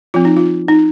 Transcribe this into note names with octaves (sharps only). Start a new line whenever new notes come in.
F3 C4 F4
D#4
F4
D#4